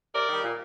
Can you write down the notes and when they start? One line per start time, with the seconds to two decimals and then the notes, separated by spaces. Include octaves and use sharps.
0.13 C3 A#4 D5
0.29 D#3 G3
0.43 A#2